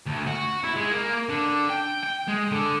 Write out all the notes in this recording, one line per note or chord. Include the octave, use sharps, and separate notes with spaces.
D2
F#4
E4
G#3
A#3
D3
G5
G5
G#3
D3